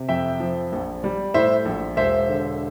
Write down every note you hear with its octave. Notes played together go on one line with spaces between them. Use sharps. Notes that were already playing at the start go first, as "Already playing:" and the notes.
Already playing: C3
F2 E5 G5
F3
A#1
G3
A2 C5 E5
A#1
E1 C5 E5
D3